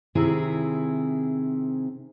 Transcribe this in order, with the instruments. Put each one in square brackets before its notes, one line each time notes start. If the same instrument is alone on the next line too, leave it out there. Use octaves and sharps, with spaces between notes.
[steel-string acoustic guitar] C3 D#3 C4 E4 G#4